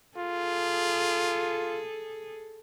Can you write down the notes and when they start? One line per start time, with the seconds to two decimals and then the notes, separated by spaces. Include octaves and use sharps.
0.18 F4 G#4 A4